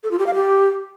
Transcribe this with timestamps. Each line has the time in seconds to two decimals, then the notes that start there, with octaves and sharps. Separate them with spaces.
0.03 A4
0.11 F4
0.19 G4
0.26 F5
0.34 G4